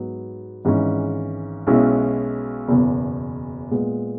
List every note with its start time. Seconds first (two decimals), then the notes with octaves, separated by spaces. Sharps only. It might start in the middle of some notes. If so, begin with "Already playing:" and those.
Already playing: G#2 F#3 B3
0.65 G#1 G#2 E3 G#3 C#4
1.67 B1 B2 G#3 C#4 E4
2.68 F#1 E2 B2
3.71 A#2 G#3 B3